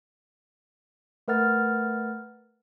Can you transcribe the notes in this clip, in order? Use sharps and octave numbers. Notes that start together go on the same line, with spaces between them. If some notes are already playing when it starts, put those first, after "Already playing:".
A3 A#4 B4 F#5 F6 A6